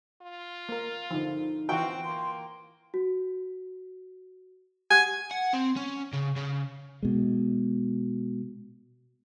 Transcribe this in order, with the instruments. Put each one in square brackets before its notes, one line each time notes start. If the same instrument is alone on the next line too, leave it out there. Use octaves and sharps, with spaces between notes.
[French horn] F4
[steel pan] A#3 A#4
[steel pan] D3 F3 [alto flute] D#4
[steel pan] E3 F4 F#4 [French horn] C4 [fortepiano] G5
[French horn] A#3 [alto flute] C6
[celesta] F#4
[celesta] G4 F#5 F#6 [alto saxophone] G#5
[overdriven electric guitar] F#5
C4
C#4
C#3
C#3
[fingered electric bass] B2 G#3